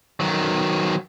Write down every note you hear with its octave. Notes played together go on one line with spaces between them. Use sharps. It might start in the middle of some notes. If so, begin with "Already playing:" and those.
D#3 F#3